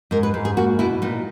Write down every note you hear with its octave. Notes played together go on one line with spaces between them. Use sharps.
G#2 A#4
B4
G#2
G#4
A#3 F#4
B2 E4
A#2 D#4